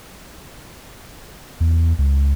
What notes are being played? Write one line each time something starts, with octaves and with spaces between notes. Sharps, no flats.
E2
C#2